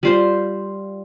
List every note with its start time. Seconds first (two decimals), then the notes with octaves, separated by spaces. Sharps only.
0.03 G3 F4 C5